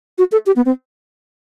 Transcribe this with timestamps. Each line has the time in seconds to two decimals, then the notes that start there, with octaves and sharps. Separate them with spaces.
0.18 F#4
0.32 A4
0.46 G4
0.56 B3
0.66 C4